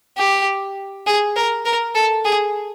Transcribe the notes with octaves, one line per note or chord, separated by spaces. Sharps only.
G4
G#4
A#4
A#4
A4
G#4